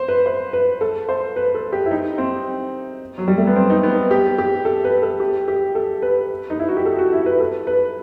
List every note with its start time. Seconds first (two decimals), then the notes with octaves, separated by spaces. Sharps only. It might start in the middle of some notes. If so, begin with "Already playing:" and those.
Already playing: C5
0.08 B4
0.26 C5
0.53 B4
0.81 A4
1.09 C5
1.36 B4
1.55 A4
1.72 G4
1.86 E4
1.91 D#4
2.18 C4
3.18 F#3
3.28 G3
3.37 A3
3.47 B3
3.56 C4
3.70 D#4
3.83 B3
4.11 G4
4.38 G4
4.65 A4
4.85 B4
5.02 A4
5.20 G4
5.48 G4
5.75 A4
6.02 B4
6.50 D#4
6.59 E4
6.68 F#4
6.77 G4
6.85 A4
6.98 F#4
7.13 E4
7.26 B4
7.40 A4
7.67 B4